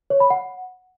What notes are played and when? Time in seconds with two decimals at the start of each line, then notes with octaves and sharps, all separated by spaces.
0.10 C#5
0.20 B5
0.30 F#5